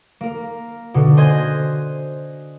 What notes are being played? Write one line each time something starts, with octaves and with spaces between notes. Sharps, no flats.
A#3 A#4
B2 D3
C5 D#5 G#5 C6 F#6 G#6